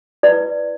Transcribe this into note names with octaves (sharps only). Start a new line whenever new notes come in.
E4 B4 D5